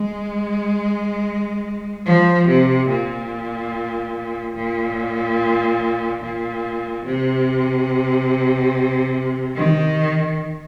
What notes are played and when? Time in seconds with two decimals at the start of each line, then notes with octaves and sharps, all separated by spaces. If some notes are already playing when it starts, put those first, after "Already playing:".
Already playing: G#3
2.06 F3
2.47 C3
2.89 A#2
4.55 A#2
6.22 A#2
7.05 C3
9.56 D#3